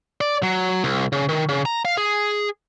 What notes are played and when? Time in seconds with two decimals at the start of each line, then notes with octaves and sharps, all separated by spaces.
0.21 D5
0.43 F#3
0.84 C2
1.12 C#3
1.29 D#3
1.49 C#3
1.66 A#5
1.85 F5
1.98 G#4